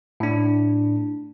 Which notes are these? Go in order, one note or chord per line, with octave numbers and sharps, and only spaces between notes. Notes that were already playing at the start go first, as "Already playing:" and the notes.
A2 D4